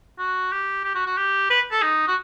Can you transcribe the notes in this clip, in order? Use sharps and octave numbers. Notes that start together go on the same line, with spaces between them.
F#4
G4
G4
F#4
F#4
G4
B4
A4
D#4
F#4